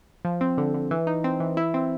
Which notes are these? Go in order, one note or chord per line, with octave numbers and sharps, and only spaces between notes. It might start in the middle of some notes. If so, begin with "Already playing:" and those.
F3
C4
D3
D3
E3
D#4
C4
E3
E4
C4